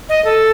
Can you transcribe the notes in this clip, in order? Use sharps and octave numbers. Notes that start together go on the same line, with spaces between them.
D#5
A4